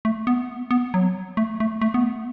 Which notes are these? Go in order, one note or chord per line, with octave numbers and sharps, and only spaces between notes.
A3
B3
B3
F#3
A3
A3
A3
B3
A3